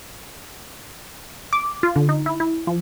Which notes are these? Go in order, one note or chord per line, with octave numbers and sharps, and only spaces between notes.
D6
F4
D3
D#4
E4
E4
F3